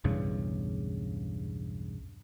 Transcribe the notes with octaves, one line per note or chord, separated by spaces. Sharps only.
B1 E2 G2 C#3